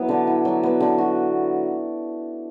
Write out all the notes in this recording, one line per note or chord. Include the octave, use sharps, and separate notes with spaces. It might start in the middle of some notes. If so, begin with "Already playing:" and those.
Already playing: F#3 B3 E4
D3
E4
F#3
B3
D3
F#4